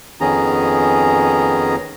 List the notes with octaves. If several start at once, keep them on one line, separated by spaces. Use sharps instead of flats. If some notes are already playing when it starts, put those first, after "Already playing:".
F2 D#3 B3 C#4 G#4 A#5